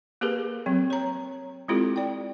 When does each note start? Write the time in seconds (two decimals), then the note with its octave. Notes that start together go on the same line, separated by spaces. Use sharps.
0.21 A#3 G4 G#4 A#4 B4
0.66 F#3 C4
0.90 C#5 A#5
1.68 G#3 C4 E4 F4 G4 A4
1.96 D5 G5